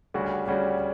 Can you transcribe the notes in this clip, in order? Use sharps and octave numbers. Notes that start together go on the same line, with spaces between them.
D2 C#3 G3 C#4 F#4
D2 C#3 G3 C#4 F#4